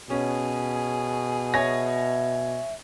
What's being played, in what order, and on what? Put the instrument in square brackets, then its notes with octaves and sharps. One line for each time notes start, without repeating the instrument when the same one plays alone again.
[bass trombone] B2 [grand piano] C#4 [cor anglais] G#4
[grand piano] C#5 G#5 A#6 [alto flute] E5